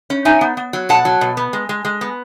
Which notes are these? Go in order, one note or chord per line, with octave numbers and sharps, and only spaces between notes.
C#4
D#4 E5 G#5
B3
B3
F#3
B2 F#5 A5
F#3
B2
B3
G#3
G#3
G#3
B3